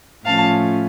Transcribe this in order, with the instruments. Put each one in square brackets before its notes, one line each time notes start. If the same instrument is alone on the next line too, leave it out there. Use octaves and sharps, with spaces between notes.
[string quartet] A2 F3 A3 C#4 F4 F5 A5